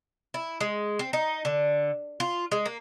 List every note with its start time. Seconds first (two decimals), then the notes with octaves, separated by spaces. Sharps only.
0.34 E4
0.61 G#3
0.99 C4
1.13 D#4
1.45 D3
2.20 F4
2.52 G#3
2.66 A#3